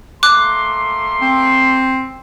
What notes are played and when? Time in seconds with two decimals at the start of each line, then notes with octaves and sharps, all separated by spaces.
0.23 A3 A#3 C6 D6 F#6
1.22 C4